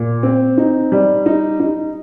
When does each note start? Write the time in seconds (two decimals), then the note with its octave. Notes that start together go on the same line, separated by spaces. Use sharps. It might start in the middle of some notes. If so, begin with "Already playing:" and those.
Already playing: A#2
0.23 C4
0.58 D#4
0.92 G3
1.26 D#4
1.60 D#4